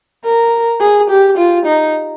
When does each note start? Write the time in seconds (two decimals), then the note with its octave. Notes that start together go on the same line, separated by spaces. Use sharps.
0.25 A#4
0.81 G#4
1.10 G4
1.38 F4
1.66 D#4